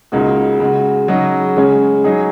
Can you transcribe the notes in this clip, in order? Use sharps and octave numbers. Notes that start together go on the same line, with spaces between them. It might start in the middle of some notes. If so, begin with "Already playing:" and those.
C#2 C#3 A#3 D#4 F#4
C#3 G#3 F#4
C#3 F#3 D#4 F#4
C#3 G#3 C#4
F#3 D#4 G#4